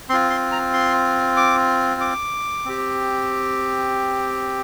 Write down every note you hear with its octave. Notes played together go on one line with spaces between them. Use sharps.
C4 F4 C6
C6
A#5
C6
D6
D6
C4 G4